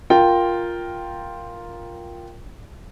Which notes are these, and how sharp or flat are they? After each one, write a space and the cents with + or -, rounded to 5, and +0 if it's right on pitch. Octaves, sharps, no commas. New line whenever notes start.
F4 +0 A#4 +0 G5 +0